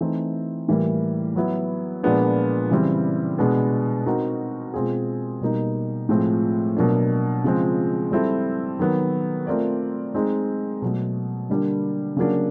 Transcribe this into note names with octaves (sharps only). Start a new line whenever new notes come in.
E3 A3 C4 D#4
A2 E3 G3 A#3
F#3 B3 E4
A#2 F3 G#3 B3 D4
C#3 E3 G3 C4 E4
B2 G#3 B3 D4
C4 D#4 F#4 A#4
B2 G#3 C4 F4 G#4
B2 G3 A#3 D#4
A2 F3 G#3 C4
B2 F#3 A#3 D4
C#3 F3 G#3 C4
G3 C4 E4 A4
D#3 F#3 B3
A3 C4 F4 A#4 D5
G#3 C4 D#4
B2 F#3 A3
D3 G3 A#3 D4
C#3 F#3 A#3 D4